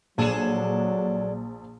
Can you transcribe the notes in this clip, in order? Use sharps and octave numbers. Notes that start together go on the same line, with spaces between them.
A#1 F#3 D4 G#4 A4 E7